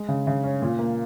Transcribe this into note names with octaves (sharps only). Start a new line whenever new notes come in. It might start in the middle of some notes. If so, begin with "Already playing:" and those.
Already playing: G#3
C#3
C#3
C#4
A#2
A#3